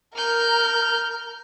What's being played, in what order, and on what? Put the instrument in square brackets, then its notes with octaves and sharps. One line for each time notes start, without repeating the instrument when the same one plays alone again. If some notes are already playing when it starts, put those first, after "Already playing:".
[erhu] A#4 [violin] F6 G6